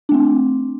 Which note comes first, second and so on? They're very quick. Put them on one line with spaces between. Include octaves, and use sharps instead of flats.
D4 A3 C4